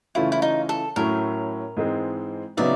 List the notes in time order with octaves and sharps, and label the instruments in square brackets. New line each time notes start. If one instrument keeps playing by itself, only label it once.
[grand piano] C#3 E3 A3 C#4 F4 [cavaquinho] E4
[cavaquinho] E4
D#4
A4
[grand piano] A2 F#3 A3 C#4 E4 [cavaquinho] A#4
[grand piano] G#2 E3 G#3 C4
[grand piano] C#3 F#3 B3 D#4 [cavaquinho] D5 E5